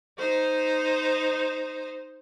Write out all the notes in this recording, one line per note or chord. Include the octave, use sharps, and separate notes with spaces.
D#4 C5